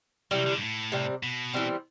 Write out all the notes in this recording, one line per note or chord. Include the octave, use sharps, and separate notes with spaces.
C3 E3 F#3 G3
D3
G2
A2
C3 G3 C4
B2
E3 G3 C4